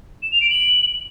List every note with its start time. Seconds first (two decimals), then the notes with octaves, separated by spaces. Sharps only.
0.22 E7
0.32 F7
0.41 D7
0.50 F#7